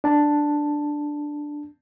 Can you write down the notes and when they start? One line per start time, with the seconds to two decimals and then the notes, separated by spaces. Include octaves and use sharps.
0.04 D4 A5